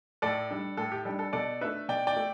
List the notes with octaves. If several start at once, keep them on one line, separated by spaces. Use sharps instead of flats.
A2 A4 D5
G3 D4
A2 A4
G4
G3 D4 A4
A4
B2 A4 D5
A3 D4 B4 E5
B2 D5 G5
D5 G5
A3